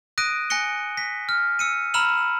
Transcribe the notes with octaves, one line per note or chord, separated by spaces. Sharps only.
D#6 F#6 A#6 D7 D#7
G#5 F#6 A#6 C#7 G7
A#6 B6
F6
E6 C#7 D#7
A#5 B5 E6 F6 E7 F#7